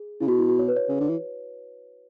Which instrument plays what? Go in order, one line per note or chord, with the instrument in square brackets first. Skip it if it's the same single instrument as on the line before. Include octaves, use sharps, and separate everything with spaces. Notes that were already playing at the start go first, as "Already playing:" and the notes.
Already playing: [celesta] G#4
[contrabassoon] C#3 [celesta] E4
[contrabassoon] B2 [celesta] F#4
[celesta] E4
F#4
C#5
B4
C#5
[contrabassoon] C#3
D3
E3